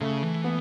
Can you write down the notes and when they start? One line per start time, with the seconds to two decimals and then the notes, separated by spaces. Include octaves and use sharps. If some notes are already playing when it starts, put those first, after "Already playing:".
0.01 C#3 A3
0.23 E3
0.44 B3